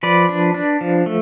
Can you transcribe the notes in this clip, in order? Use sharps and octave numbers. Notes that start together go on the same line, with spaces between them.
F3 B4 D5
D4
D4
F3
A3